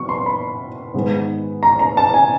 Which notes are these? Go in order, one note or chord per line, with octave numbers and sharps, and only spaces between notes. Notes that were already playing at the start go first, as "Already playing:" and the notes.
Already playing: C3 F#3 B3 C#6
C6
B5
G#2 D#3 G#3 B3
A#5
A#5
A5
G#5